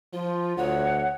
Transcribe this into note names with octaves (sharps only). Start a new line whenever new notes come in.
F3 F4
D2 C#5 F#5